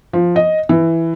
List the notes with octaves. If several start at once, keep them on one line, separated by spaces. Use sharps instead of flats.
F3
D#5
E3